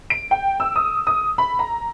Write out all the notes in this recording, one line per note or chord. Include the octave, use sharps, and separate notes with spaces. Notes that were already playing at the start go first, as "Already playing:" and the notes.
D7
G5
E6
D#6
D#6
B5
A#5